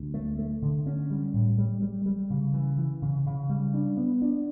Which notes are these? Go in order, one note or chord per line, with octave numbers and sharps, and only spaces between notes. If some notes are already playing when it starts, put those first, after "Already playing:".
Already playing: D2
A3
A3
D3
C#4
G3
A2
G3
G3
G3
C#3
E3
E3
C#3
C#3
G3
D4
B3
D4